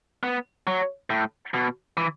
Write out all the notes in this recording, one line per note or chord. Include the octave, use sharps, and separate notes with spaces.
B3
F#3
A2
B2
E3